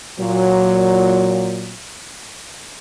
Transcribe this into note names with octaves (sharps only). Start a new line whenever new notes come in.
A#2 F#3